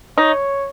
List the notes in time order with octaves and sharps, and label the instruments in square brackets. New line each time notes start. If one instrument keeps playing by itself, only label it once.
[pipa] D#4 [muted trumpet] C#5